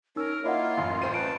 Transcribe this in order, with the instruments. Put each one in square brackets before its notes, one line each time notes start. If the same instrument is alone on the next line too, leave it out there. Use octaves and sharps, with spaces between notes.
[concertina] C#4 [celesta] D#4 E6 [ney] A#4
[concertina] A#3 E4 [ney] F4 [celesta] C#5 D#5 F#5
[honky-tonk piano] A1 F#2 E3 [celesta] C6
[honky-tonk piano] A1 C5 D#7 [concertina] G5
[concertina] B4 A5 [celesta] D7